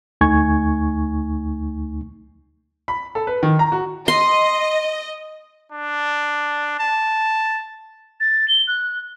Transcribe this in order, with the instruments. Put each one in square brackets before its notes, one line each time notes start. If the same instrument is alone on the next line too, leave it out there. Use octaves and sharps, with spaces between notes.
[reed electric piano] D2 A3 D#4 G#5 C#6 G#6
[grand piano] B5
A4
B4
D#3
A#5
F#4
[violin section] D#5 [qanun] C6
[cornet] D4
A5
[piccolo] A6
G7
F#6